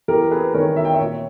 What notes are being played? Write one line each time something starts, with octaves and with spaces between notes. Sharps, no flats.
E2 G4 A#4
G#4 B4
D#3 A#4 C#5
E5
G5
C#5 E5
A#2